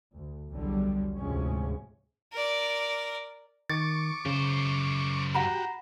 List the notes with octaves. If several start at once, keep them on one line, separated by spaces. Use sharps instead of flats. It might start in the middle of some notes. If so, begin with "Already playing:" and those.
D2
B1 E2 D3 F#3 G3
D2 G#2 C3 F3 G#3 C#4
A#4 D5
D#3 C#6 D6 A6
F#2 C#3 C5
F#4 G4 F#5 A#5 B5